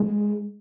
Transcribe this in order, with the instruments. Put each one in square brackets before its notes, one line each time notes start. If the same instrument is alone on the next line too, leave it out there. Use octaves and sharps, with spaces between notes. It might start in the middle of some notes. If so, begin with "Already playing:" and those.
Already playing: [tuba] G#3